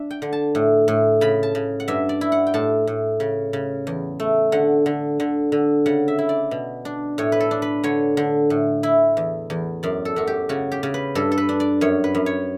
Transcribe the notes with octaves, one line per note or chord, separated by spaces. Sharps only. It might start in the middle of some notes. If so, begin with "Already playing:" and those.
Already playing: D4 E5
G5
D3
A5
A2
A2
C#3 B5
A5
C#3
F#5
G2 E5
D5
E4
F#5
G5
A2 A5
A2
C#3
C#3
E2
A3
D3 F#5
D3
D3
D3
C#3 F#5
E5
E4
D5
B2
D4
A2 C#5
B4
A4
D4
B4
D3 C#5
D3
A2
E4
E2
E2
F#2 D5
A4
F#2 F#4
G4
C#3 F#4
G4
C#3
B4
G2 A4
A4
B4
D4
D5
F#2 C#5
B4
F#2
C#5